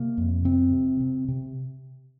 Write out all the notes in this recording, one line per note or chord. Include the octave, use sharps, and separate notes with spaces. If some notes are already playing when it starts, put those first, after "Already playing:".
Already playing: C3 A#3
F2
C3 C4
C3
C3
C3